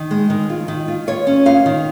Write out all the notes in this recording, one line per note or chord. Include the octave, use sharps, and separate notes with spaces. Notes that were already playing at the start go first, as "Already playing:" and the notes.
Already playing: D#3
G#3
D#3
F4
D#3
F4
F4 C#5
C#4
F4 F5
D#3